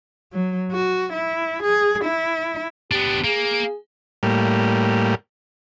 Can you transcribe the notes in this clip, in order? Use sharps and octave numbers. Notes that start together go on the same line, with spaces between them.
F#3
F#4
E4
G#4
E4
B3 D4 G4
A#3 G#4
A2 G3 A#3